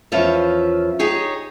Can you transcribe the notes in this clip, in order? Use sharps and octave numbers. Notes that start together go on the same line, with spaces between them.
E2 F3 C#4 F4 E5
D#4 G4 G#4 C#5